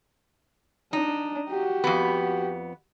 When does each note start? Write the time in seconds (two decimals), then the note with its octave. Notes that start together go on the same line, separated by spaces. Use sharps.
0.93 D4 D#4
1.50 F#4 G4
1.84 F2 B3